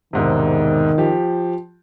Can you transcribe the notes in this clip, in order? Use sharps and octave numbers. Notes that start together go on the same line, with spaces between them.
E1 G#2 C3 D#3
F3 G4